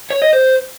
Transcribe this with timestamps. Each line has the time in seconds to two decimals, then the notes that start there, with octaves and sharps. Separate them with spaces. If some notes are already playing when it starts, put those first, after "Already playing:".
0.10 C#5
0.22 D#5
0.33 C5